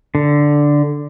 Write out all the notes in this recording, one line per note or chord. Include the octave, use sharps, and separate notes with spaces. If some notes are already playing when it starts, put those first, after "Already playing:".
D3